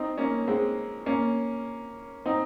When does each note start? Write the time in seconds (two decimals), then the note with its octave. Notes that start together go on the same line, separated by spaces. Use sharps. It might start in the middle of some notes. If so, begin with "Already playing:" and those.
Already playing: C4 D#4
0.18 A#3 C#4
0.47 G#3 C4
1.06 A#3 C#4
2.26 C4 D#4